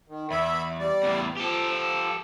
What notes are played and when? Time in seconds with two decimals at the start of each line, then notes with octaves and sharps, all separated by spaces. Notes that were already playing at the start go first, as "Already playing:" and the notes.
0.08 D#3
0.31 E2 E5 B5
0.79 G3 D5
1.03 E2 A2
1.37 F3 G4 A4